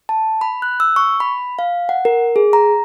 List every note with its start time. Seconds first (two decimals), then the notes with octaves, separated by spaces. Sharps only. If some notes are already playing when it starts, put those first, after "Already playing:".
0.09 A5
0.41 B5
0.62 F#6
0.80 E6
0.96 C#6
1.20 B5
1.59 F5
1.89 F#5
2.05 A#4
2.36 G#4
2.53 A#5